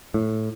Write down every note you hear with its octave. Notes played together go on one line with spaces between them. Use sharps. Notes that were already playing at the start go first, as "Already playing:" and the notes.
A2